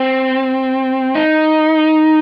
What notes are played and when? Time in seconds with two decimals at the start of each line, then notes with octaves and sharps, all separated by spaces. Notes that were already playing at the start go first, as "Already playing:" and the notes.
Already playing: C4
1.15 D#4